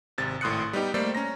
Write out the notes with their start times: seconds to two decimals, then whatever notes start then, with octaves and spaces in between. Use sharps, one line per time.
0.18 G#1 C3 A6
0.41 G#1 A2 C6 D#6 F#6 C#7
0.73 G3 B3 D#4 G4
0.94 G3 A3 A#3 A4 C5 D5
1.15 C#4 A#5 A#6